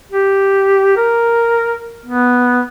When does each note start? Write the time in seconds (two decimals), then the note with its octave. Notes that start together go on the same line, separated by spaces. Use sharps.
0.12 G4
0.97 A#4
2.06 B3